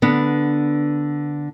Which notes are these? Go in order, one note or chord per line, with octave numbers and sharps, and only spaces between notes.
D3 B3 D4